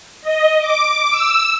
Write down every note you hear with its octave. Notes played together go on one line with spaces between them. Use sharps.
D#5
D6
E6